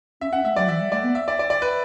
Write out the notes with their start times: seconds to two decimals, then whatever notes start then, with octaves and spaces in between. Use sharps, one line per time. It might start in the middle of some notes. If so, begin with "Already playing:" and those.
0.21 C#4 E5
0.33 C#4 F#5
0.45 A3 E5
0.56 F#3 D5
0.68 E3 E5
0.80 G3
0.92 A3 D5
1.03 B3
1.15 E5
1.28 D5
1.39 D5
1.50 D5
1.62 B4